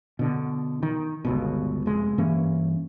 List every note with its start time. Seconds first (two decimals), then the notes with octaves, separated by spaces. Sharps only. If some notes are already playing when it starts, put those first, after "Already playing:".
0.19 B2 D3
0.83 D#3
1.25 G1 C#2 B2
1.86 F1 G#3
2.18 G2 E3 A#3 C#4